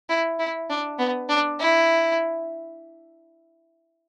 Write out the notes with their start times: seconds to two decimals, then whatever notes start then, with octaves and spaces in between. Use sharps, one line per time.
0.09 E4
0.39 E4
0.70 D4
0.99 B3
1.29 D4
1.60 E4